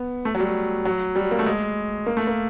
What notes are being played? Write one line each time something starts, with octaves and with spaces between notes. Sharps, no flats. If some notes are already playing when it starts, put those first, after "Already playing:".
Already playing: B3
A3
F#3
G3
F#3
G3
A#3
A3
G#3
A#3
A3
A#3